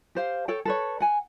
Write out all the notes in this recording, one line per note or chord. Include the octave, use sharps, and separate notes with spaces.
G4 C5 F5
A4 C#5 G5
A4 B4 C#5
F#5 G#5